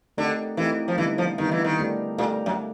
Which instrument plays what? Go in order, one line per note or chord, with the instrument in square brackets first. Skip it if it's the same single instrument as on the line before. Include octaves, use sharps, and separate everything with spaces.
[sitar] D3 [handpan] A3 C4 D#4 G4 A#4
[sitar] E3 [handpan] A3 C4 D#4 G4 A#4
[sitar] F3
[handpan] D3 G3 B3 D#4 [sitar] E3
[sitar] F3
[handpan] D3 G3 B3 D#4 [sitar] D#3
[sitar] E3
D#3
[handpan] A3 D4 G4 A#4
[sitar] A#2 [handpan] A3 D4 G4 A#4
[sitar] F#2